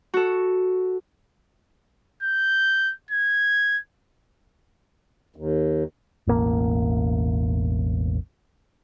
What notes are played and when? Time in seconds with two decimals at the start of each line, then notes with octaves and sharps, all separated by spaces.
0.14 F#4 A4
2.23 G6
3.11 G#6
5.36 D#2
6.27 E1 A1 A#3